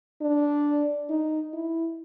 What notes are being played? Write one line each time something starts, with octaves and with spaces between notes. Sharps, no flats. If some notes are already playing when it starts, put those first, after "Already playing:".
D4
D#4
E4